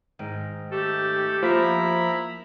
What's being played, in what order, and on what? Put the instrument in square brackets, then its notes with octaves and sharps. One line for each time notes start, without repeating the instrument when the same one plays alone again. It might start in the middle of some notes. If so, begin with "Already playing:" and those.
[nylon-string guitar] G#2 D#3
[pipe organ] A3 A4 [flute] G4
[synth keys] F3 [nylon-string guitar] A#3 [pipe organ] E4 A#5 B5